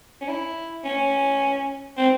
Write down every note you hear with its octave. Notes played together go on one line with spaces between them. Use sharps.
C#4
E4
C#4
C4